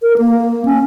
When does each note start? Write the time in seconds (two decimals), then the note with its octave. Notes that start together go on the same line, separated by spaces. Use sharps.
0.02 A#4
0.18 A#3
0.65 C#4